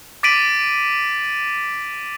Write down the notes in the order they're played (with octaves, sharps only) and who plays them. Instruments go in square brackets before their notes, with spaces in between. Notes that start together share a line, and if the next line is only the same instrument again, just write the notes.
[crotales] D6 A6 B6 D7 D#7 F#7